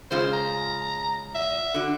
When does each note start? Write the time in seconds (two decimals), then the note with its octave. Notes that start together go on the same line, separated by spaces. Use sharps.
0.11 C#3 G#3 F4 C5
0.33 A#5
1.35 E5
1.74 D3 F#4